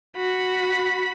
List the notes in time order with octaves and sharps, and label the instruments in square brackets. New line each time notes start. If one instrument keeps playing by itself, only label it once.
[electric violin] F#4 B5